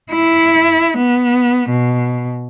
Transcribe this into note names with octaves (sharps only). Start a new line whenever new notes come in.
E4
B3
B2